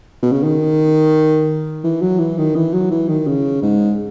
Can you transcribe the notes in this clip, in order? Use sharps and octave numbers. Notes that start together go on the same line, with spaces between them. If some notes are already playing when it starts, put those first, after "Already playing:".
B2
C#3
D#3
E3
F#3
E3
D#3
E3
F#3
E3
D#3
C#3
G#2